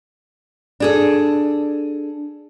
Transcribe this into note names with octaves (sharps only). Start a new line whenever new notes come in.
D4 G#4 A4